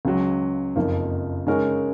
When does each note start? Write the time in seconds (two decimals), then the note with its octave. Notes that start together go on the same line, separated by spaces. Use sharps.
0.05 C#2 C#3 F#3
0.76 F#1 F2 F3 A#3 D#4
1.47 C#3 G#3 D#4 A#4 C#5